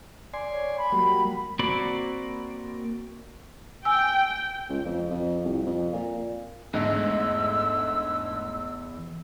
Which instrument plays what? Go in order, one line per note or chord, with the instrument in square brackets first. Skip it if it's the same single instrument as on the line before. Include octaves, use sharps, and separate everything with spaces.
[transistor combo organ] D5 G#5 C6
[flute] C#5
B5
[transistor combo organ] F#3 G3 A#3
[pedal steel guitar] A#3 C4 F#4 D5 B5
[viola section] G5 [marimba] G#5 E6
[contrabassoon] C#2
F2
F2
C2
F2
A#2
[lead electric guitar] E2 [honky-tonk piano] G#2 [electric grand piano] D3 G#3 A3 [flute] E6